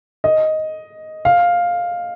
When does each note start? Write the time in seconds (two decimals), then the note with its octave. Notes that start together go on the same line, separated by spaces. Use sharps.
0.24 D#5
1.25 F5